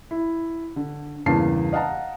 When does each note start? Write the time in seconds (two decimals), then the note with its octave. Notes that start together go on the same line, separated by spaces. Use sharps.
0.11 E4
0.76 D3
1.26 E2 G2 C#3 A#3 A5 C7
1.73 D#5 F5 F#5 A5 A#5